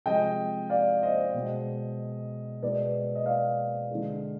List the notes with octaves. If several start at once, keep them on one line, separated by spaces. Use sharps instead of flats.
C3 F3 G#3 D#5 G5
D5 F5
C5 D#5
B2 G#3
B2 G#3 B4 D5
D#5
D5 F5
D3 G#3